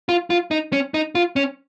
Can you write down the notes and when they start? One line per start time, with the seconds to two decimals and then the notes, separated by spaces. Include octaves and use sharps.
0.09 F4
0.30 F4
0.51 D#4
0.73 C#4
0.94 D#4
1.15 F4
1.36 C#4